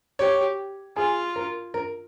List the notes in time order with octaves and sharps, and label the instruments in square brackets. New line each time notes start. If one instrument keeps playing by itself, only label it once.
[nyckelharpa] G4 [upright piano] C#5
[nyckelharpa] F4 [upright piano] G#4
[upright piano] A#4
A#4